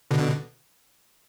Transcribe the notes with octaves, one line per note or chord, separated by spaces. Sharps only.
B2 D3